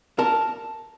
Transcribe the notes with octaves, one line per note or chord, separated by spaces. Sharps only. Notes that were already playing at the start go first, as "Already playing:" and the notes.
A#4 A5